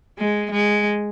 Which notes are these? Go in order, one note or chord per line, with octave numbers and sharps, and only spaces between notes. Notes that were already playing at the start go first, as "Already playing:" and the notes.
G#3
G#3